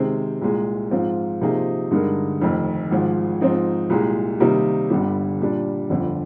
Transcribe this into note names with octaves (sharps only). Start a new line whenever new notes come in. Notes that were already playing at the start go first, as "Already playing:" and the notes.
Already playing: C3 D#3 G#3 C4
C2 A#2 G#3
G#2 F3 C4 F4
C3 F3 A#3 D#4 G#4
G2 D3 G#3 D#4 A#4
F1 F2 D#3
G#1 G#2 F3
G#2 F3 C4 D#4
C2 A#2 G#3
C3 D#3 G3 A#3 D#4
G1 G2 D3 G3
A#2 G3 D4
G1 F2 D3